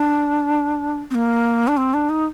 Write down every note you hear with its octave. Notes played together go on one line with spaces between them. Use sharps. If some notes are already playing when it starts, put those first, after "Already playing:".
Already playing: D4
C4
A#3
D4
C4
D4
D#4